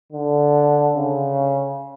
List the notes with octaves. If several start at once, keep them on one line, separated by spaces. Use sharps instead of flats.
D3
C#3